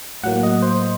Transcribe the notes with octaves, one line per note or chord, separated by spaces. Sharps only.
A2 F#3 A#3 F#5
D#5
C5